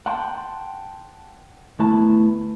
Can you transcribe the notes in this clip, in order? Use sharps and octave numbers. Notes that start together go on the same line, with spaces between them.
F#5 G5 A5 C6
D2 A3 B3 E4 A5